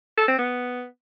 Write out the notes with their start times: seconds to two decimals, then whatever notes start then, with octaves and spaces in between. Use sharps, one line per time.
0.18 A4
0.28 C4
0.38 B3